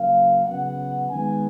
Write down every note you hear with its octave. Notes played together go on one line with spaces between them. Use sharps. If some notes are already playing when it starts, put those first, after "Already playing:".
Already playing: C#3 F#3 A#3 F5
C#3 F#3 B3 F#5
D#3 G#3 B3 G#5